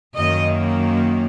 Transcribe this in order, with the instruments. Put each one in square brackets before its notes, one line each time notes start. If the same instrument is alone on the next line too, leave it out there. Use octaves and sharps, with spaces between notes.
[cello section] F#2 D#3 A#3 D#5